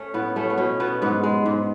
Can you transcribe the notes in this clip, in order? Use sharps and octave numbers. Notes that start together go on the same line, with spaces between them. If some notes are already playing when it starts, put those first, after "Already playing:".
Already playing: A3 C#4
A2 B3
A3 C#4
B3
B2 C#4
B2 B3
G#2 B3
G#3
G#2